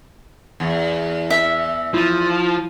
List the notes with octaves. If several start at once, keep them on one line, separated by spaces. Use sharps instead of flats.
E2
E5
F3 E4 D#7